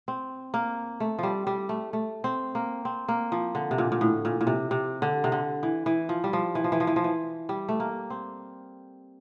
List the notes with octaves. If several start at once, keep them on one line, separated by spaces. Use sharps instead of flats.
C4
A#3
A3
F3 G3
G3
A3
A3
C4
A#3
C4
A#3
F3
D3
C3
A#2
A#2
A2
A#2
A#2
C3
C3
D3
C3
D3
E3
E3
F3
G3
F3
E3
F3
E3
F3
E3
F3
E3
G3
A3
A#3
C4